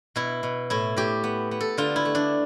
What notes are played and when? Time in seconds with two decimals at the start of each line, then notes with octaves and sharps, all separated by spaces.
0.16 B2 E4
0.43 B2
0.70 A2 E4
0.97 A2 G4
1.24 B3
1.51 B3
1.61 A4
1.78 D3 F4
1.96 E4
2.05 A3
2.15 D4